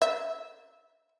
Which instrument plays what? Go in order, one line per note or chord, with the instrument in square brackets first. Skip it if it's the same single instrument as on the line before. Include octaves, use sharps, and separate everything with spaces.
[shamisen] E5